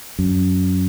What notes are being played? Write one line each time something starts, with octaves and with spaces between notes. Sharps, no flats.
F#2